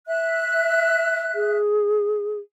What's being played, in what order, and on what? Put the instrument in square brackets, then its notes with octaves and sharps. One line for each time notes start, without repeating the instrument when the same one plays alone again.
[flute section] E5 F#6
[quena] G#4